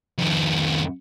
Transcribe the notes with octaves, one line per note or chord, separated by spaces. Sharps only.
F2 D#3